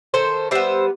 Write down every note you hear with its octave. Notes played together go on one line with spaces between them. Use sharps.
D#3 A4 C5
G3 B3 C5 E5